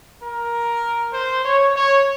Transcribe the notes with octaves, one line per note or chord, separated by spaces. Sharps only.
A#4
C5
C#5
C#5